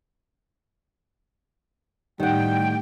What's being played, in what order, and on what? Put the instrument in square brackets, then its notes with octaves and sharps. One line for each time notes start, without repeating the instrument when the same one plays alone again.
[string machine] A2 G4 [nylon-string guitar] D#3 F#5 [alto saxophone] G3 [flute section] G5